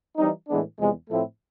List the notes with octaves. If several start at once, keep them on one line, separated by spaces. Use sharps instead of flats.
E3 G3 C4 D#4
A2 E3 G#3 B3 D4
E2 C3 F3 G#3
A2 F3 A3 C4 E4